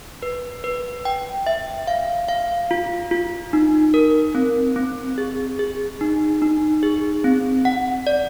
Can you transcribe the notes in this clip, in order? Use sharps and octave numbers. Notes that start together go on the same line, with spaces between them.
B4
B4
G5
E5
F5
F5
F4
F4
D#4
A#4
C4
C4
G#4
G#4
D#4
D#4
G#4
C4
F#5
D5